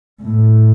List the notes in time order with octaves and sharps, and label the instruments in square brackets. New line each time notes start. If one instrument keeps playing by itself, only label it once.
[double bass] A2